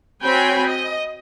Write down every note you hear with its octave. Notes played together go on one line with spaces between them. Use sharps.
C4 F#4 C#5 G5 G#5 B5
D#5